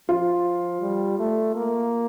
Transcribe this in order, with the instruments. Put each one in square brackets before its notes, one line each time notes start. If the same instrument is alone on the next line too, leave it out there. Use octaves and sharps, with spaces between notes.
[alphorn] F3 [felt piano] F4
[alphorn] G3
A3
A#3